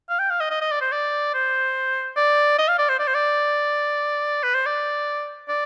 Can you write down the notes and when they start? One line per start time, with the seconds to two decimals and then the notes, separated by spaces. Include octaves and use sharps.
0.09 F5
0.19 G5
0.30 F5
0.40 D#5
0.50 D#5
0.61 D#5
0.71 D5
0.81 C5
0.92 D5
1.34 C5
2.17 D5
2.59 D#5
2.68 F5
2.79 D5
2.89 C5
2.99 D5
3.08 C5
3.15 D5
4.43 B4
4.55 C5
4.66 D5
5.49 D5